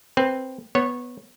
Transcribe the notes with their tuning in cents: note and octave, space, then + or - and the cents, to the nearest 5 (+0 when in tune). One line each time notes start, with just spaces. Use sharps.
C4 +0 B4 +0
B3 +0 C#5 -20